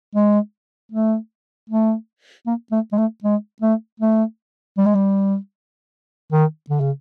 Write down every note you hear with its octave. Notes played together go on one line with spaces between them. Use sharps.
G#3
A3
A3
A#3
A3
G#3
A3
G#3
A3
A3
G3
G#3
G3
D#3
D3
C#3